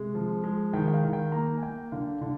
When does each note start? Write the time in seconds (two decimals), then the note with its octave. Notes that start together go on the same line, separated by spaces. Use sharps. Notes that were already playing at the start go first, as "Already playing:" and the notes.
Already playing: C3 G#3
0.15 F3
0.44 G#3
0.73 D#3 G5
0.88 G5
0.94 F5
1.03 D#3
1.13 G5
1.32 A#3 A#5
1.58 G#5
1.62 A#3 G5
1.92 D3 F5
2.21 D3